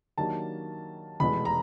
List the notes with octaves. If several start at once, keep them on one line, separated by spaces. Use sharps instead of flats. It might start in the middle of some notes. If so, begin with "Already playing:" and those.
D#3 F#3 A#3 D4 G4 A5
F1 E2 B2 G#3 B3 B5
A#5